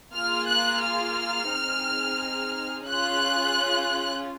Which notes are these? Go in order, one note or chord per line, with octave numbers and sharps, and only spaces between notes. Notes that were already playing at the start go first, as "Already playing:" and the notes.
A#3 F4 G#4 F6
F#6
F6
C4 D#4 G#4
C#4 F4 G#4 F#6